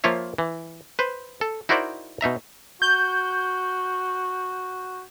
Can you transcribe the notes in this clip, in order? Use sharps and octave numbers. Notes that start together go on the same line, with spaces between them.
F3 A#3 F4 C#5 E5
E3
B4 C5
A4
D#4 E4 F#4 A#4 C5 D5
B2 D#4 E5 A#5
F#4 G6